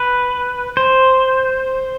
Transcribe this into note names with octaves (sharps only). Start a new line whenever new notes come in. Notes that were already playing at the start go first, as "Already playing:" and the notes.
Already playing: B4
C5